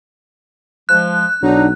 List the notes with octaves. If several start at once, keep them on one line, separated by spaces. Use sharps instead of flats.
F3 G#3 F#6
B1 F#3 B3 D4 D#4